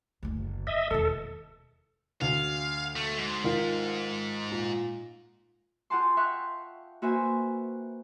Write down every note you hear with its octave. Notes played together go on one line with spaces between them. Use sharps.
F#1 D2
G2 D#5 E5
E1 D#2 A4
D2 F5
A3
G#2
D#3 F4
A#2
F4 G#4 F#5 G5 A5 C6
E5 F5 G5 C6 C#6 F#6
A#3 F#4 B4 C5 E5 G#5